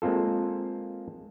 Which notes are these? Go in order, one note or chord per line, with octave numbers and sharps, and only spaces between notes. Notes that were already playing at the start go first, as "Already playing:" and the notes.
G#3 A#3 C4 F4 A4